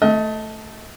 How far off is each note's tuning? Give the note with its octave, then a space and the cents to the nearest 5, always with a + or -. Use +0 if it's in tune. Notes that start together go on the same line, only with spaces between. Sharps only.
A3 +0 D#5 +30